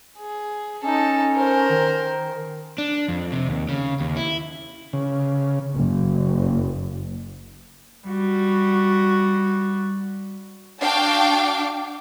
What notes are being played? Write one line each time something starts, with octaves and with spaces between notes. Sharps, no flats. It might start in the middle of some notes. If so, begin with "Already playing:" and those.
G#4
C#4 D#4 A4
A#4 C5
D#3
D4
F2
C3
D#2
C#3
D#2
E4
C#3
F#1
G3 F#4
D4 F#4 F5 G5 A5 D6